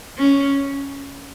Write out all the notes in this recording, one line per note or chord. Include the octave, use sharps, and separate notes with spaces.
C#4